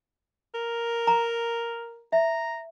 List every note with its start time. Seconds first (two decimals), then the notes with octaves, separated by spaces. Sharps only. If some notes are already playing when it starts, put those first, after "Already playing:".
0.55 A#4
1.07 A#5
2.12 E5 A#5